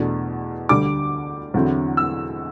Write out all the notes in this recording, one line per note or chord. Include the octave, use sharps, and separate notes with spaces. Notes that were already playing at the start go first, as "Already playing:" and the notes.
Already playing: E2 B2 A3 D4
D2 D3 G3 D4 D6
E2 D3 F#3 C4 E4
E6